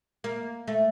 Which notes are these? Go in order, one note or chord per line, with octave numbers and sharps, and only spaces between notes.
A#3
A3